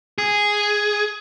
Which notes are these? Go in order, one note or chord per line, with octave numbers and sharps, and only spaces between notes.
G#4